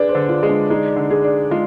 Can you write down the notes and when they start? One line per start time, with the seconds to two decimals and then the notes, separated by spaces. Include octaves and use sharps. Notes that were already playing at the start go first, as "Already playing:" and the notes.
Already playing: D4 G#4 B4
0.09 C5
0.15 D3
0.29 F4
0.43 G#3
0.49 D4
0.70 G#3 D#4
0.96 D3
1.10 G#4
1.24 D4
1.51 G#3 F4